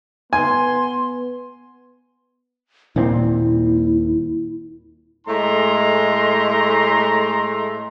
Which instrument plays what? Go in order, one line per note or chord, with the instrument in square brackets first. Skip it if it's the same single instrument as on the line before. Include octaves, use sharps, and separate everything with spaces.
[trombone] B3 [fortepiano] G#5 [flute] C6
[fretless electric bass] D#1 A#2 C4 [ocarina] E4
[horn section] A2 G#3 A3 A#5 C6